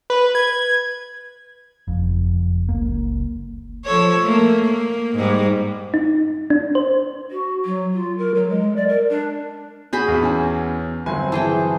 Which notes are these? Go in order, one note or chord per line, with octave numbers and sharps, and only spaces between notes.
B4
G#6
F#1 F2
C#2 A#3
F3 A4 C#5
A3 A#3
A#3
G#2 G3
D#4
D4
C5
F#4
F#3
F4
A#4
F#3
G#3
D5
A#4
D4
F#4 G#4 B5 G6
E2
C#4 G#5
G1 F#3 C4 G#5
E3 G#4 G5 A5